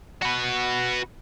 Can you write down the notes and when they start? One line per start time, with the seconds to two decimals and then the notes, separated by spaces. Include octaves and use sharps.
0.22 F#4 B4